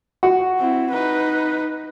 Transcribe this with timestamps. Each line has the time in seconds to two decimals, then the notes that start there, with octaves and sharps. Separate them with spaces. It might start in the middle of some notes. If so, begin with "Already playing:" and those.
0.23 F#4
0.59 C4 E4
0.91 D#4 B4